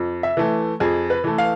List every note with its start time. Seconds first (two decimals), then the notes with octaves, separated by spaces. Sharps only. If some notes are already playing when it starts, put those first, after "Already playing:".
Already playing: F2
0.23 E5
0.37 E3 A3
0.80 F2 G#4
1.10 B4
1.24 E3 A3
1.38 F5